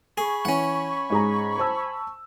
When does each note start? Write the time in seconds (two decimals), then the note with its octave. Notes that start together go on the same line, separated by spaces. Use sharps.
0.18 G#4 G#5 B5 C#6
0.45 E3 C#4 F#5
1.10 G#2 G#4 A#5
1.58 C5 A5 E6